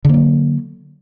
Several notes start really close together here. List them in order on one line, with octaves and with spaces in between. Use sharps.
D3 A#3 F#3